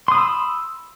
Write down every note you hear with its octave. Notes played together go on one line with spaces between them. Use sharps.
B5 C6 D#6 E6